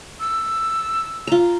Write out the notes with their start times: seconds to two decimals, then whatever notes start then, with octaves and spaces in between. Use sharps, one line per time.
0.20 E6
1.27 F4 A#5